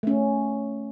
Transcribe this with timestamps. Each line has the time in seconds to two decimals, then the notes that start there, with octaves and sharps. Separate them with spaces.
0.03 A3 C#4